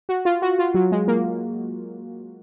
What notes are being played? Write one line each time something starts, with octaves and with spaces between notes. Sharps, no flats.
F#4
F4
F#4
F4
F#3
G#3
A#3